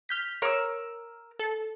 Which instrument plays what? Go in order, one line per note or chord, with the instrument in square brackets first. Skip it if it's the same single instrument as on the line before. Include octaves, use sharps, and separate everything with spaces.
[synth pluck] F6 G6 B6
[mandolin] A#4 E6 [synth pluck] C#5
[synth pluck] A4